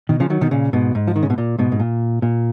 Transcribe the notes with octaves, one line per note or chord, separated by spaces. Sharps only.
B2 D#3
C#3 F3
D#3 F#3
B2 D#3
A#2 C#3
G#2 B2
G#2
F3
D#3
C#3
B2
A#2
G#2 B2
G#2
A#2
A#2